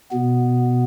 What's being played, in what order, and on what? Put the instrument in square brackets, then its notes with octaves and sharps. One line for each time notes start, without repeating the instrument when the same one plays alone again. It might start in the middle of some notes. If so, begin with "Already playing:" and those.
[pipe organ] B2 B3